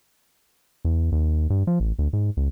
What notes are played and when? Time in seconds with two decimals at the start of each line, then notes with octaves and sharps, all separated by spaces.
0.85 E2
1.12 D#2
1.50 G2
1.67 F3
1.80 A1
1.99 D2
2.13 G#2
2.37 C#2